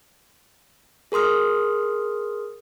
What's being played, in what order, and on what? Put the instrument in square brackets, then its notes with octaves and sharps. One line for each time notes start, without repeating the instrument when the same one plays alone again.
[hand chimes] G#4 A#4 C6 D#6 F6